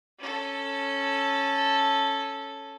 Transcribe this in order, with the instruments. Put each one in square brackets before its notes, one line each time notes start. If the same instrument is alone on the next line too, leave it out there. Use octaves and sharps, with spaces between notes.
[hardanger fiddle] C#4 A4